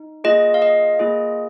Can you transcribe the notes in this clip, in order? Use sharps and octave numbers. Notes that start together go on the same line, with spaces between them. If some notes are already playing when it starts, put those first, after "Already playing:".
Already playing: D#4
A#3 F4 G#4 D#5
F5
D#5
A#3 F4 G#4